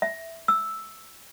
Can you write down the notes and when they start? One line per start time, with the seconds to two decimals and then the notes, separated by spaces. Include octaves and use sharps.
0.02 E5
0.48 E6